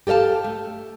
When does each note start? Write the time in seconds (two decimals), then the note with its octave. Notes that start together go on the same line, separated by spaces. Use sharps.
0.07 G4 A4 D5 F5 A5
0.44 A3